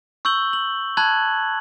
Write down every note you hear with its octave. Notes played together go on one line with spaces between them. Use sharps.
C#6 E6 G6 F#7 G7
F#7
A5 B5 F#6 G#6 F#7